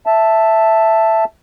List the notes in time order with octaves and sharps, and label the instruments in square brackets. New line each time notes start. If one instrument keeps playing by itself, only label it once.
[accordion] E5 A5